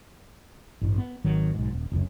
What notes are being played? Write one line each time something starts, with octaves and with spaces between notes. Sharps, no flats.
A1 G2
B3
G#1 D#3 F#3
B1 G#2
D#1
F1 C#2 F#2